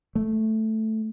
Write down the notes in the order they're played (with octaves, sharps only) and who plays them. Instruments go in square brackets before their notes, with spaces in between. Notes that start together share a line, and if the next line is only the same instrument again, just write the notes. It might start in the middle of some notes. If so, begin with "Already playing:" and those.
[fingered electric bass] A3